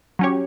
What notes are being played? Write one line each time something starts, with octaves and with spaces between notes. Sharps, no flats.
F#3 C#4 G4 C#5